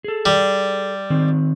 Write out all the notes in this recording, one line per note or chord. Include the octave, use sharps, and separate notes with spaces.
G#4 A4
G3
D#3 C4